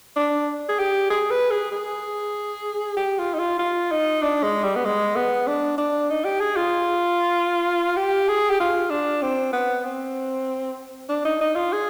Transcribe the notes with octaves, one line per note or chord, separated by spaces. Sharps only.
D4
G#4
G4
G#4
B4
G#4
G#4
G4
F4
D#4
F4
F4
D#4
D4
G#3
G3
B3
G#3
B3
D4
D4
D#4
G4
G#4
F4
G4
G#4
G4
F4
D4
C4
B3
C4
D4
D#4
D#4
F4
G#4